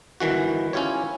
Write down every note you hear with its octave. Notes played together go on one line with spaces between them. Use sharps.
G1 D#3 E3 F#4
C#4 E4 F4 G4 C#5